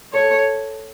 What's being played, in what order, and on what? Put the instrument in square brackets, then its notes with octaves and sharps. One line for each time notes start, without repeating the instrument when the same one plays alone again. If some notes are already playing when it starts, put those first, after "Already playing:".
[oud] A4 [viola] C#5